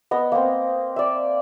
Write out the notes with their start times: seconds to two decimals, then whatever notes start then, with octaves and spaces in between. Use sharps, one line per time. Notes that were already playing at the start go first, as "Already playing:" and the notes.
0.11 B3 D#5
0.32 A#3 C4
0.96 D5 E5